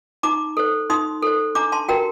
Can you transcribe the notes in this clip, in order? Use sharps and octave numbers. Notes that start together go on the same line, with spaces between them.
D#4 A#5 D6
A4 C5
D#4 C6 D#6
A4 C5
D4 A#5 D6
A5 C6
F#4 A#4 G5 A#5